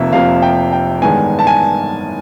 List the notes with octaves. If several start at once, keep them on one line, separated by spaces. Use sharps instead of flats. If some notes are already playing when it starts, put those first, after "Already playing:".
Already playing: F1 F2 C3 F3 A#3 E5
F1 F2 C3 F3 A#3 F5
G5
G5
A1 G2 D#3 G#3 B3 G#5
A5
G#5